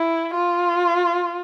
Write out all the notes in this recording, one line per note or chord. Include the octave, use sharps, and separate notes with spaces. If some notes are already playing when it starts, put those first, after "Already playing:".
Already playing: E4
F4